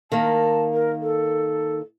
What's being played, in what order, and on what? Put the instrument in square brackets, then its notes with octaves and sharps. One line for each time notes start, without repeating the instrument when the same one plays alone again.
[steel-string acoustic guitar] D#3 A#3 [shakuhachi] A5
[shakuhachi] A#4
A4